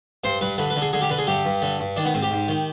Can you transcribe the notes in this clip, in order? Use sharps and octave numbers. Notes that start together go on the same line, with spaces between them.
G2 C5
G2 B4
D3 B4
B4
D3
G#4
D3 G#4
G4
D3 B4
G#4
G2 G4
G2
D3
G2
D#3 D4
B3
G#2 C4
G4
G#2
D#3